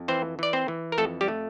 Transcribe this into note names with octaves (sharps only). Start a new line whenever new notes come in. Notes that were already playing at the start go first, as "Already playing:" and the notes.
Already playing: F2
E3 C4 C5
E3 D5
C4 C5
E3
A#4
F2 A3 A4
G3 G4
A3